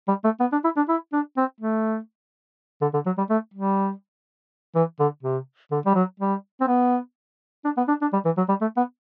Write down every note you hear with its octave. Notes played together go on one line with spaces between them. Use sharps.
G3
A3
B3
D4
E4
D4
E4
D4
C4
A3
D3
D3
F#3
G3
A3
G3
E3
D3
C3
D3
G3
F#3
G3
C4
B3
D4
B3
D4
D4
G3
E3
F#3
G3
A3
B3